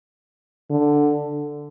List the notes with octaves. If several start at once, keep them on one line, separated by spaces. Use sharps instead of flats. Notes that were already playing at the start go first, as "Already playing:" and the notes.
D3